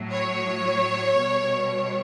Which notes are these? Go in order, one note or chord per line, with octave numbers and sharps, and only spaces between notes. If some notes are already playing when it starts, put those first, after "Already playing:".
Already playing: A2 F#3
C#5
B2 G3